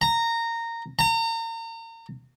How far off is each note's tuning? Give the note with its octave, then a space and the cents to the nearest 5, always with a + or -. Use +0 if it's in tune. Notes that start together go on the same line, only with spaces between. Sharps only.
A#5 -15
A#5 -35